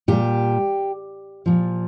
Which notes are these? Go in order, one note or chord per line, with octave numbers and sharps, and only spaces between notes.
A#2 G3 G4
A#2 F3